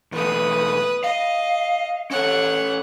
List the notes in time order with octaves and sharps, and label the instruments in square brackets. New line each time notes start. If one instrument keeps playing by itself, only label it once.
[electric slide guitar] E2 B2 A3 [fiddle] B4 D#6
[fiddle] D#5 [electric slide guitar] F5
[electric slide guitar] C#4 A4 [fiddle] C#5 F#5